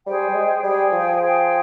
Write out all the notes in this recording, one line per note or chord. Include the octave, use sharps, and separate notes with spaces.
G3 G#4 C5 G5
G3
G#3
G3 G#4 C5 G5
F3
G#4 C5 G5